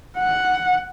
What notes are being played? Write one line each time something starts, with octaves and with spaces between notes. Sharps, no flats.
F#5